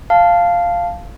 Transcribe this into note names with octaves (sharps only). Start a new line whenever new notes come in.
F5 A5